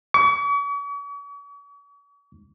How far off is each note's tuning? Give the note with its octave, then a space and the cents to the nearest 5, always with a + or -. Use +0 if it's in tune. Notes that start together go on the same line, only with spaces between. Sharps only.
C#6 +45